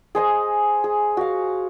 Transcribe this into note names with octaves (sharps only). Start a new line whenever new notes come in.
G#4 C5 D#5 G#5
G#4
F#4 F5